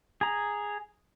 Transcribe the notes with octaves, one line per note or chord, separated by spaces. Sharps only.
G#4 A#5